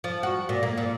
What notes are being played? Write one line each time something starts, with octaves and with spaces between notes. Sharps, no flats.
F3
F#4
A#2
A#3
A#2